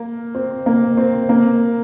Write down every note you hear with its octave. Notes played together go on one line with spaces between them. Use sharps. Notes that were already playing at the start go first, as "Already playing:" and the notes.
Already playing: A#3
C4
A#3
C4
A#3